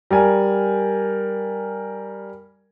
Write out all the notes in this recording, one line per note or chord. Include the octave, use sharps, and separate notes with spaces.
G3 A#4 G#5